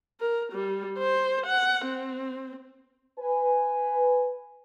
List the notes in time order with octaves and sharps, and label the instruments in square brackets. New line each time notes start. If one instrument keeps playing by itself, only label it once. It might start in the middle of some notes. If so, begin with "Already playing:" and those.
[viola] A#4
G3
C5
F#5
C4
[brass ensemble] B4 G#5